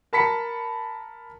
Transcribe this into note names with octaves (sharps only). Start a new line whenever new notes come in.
A#4 A5 B5 B6 C#7